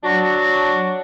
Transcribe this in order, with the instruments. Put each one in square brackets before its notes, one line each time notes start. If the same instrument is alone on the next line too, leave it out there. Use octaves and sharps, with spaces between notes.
[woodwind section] F#3 F#4 [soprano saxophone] D4